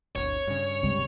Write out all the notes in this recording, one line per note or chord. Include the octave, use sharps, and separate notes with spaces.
D1 G1 C#5
G2 C#3
C#2 C3 G3